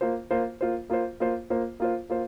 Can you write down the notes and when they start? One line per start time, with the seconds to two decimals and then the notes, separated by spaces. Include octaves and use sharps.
0.01 A#3 F4 C5
0.31 A#3 F4 C5
0.61 A#3 F4 C5
0.90 A#3 F4 C5
1.20 A#3 F4 C5
1.50 A#3 F4 C5
1.80 A#3 F4 C5
2.10 A#3 F4 C5